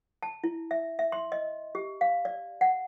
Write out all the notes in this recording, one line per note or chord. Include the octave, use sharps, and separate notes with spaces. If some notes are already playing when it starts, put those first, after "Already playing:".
A5
E4
E5
E5
C6
D#5
G4
F5
D5
F#5